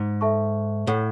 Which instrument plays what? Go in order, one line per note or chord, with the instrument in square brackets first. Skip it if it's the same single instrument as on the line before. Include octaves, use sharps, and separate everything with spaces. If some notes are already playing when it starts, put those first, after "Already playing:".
Already playing: [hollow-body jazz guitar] G#2
[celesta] A4 E5 A5 C#6
[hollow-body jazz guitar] A2 [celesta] A4 C#5 F#5